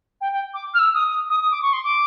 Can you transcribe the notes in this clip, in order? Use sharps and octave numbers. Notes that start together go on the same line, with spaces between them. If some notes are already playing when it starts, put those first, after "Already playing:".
G5
G5
D6
F6
E6
D#6
D#6
D#6
D#6
D6
C#6
C6
D6